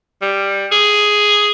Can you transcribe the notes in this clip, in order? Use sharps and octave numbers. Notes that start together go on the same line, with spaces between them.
G3
G#4